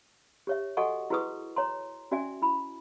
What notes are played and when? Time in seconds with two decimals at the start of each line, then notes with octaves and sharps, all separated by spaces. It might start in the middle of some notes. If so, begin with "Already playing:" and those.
0.47 G4 C#5 E5
0.77 F#4 A4 D#5 F#5 G#5 C#6
1.10 E4 F#4 G#4 B4 C#6 D#6
1.56 C#5 A#5 C6
2.11 C#4 F#4 D5 E5 G#5
2.42 E4 B5